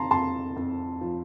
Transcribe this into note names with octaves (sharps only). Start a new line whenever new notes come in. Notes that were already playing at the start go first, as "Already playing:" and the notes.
Already playing: F2 A5 A#5 C6
F2 A5 C6
F2
F3